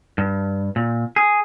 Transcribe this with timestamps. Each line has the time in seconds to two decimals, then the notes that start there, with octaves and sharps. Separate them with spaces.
0.18 G2
0.76 A#2
1.16 G#4